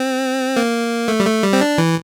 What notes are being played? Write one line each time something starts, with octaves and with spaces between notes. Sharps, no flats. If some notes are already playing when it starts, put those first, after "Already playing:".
Already playing: C4
A#3
A3
G3
A3
G3
C4
D4
E3